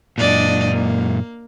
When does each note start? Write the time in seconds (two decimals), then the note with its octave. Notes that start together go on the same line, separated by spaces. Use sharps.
0.18 F#2 A#2 D4 D5 D#5
0.70 A#3